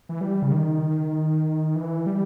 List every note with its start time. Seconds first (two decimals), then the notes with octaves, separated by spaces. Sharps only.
0.09 E3
0.21 G3
0.42 C#3
0.52 D#3
1.76 E3
2.06 G3